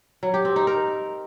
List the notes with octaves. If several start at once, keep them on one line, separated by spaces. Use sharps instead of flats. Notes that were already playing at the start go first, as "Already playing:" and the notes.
F#3
G4
C4
D#4
A#4